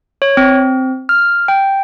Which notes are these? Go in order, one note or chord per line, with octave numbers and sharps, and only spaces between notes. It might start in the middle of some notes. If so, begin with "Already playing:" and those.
C#5
C4
F6
G5